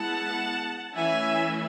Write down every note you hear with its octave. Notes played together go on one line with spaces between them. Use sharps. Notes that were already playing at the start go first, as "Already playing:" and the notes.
Already playing: G#3 B3 E4 F#5 A5
E3 A3 C#4 E4 E5 G#5